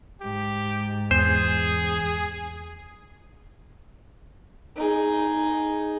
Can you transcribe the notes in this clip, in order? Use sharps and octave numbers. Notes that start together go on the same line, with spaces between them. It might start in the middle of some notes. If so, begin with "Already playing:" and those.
G#2 G4
E2 G#4 C5
D#4 G#4